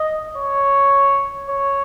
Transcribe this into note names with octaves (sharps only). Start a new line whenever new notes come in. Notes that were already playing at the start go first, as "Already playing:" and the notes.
Already playing: D#5
C#5
C#5